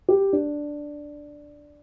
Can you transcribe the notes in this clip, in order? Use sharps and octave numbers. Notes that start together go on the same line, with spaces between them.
G4
D4